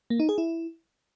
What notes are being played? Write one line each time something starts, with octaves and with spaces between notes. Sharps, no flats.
A#3
D#4
G#4
E4